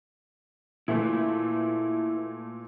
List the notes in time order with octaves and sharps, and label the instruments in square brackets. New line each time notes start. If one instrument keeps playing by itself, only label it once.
[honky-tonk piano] A#2 A3 [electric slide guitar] E4 B4